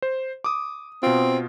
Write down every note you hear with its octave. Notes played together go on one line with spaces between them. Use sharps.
C5
D6 D#6
B2 C4 F4